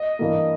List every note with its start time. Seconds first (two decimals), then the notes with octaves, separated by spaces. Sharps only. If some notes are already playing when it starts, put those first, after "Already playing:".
Already playing: D#5
0.19 G2 E3 A#3